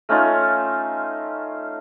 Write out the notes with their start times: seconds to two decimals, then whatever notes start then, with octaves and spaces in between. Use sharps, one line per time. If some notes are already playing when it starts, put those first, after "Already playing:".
0.09 A3 C#4 D#4 F4